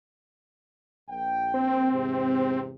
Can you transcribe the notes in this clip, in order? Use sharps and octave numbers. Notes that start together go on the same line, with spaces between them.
A#1 G5
C4
E2 G#2 C3